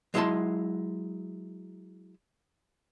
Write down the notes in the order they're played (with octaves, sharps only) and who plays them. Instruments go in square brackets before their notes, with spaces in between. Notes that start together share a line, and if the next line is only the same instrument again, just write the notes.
[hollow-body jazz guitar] F#3 G#3 E4 C#5 A5 C6